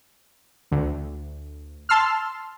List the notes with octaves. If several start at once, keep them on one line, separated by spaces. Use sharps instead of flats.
D2
A5 C6 E6 F6